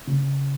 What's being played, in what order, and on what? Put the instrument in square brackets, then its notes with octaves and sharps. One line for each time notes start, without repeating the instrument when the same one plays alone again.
[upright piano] C#3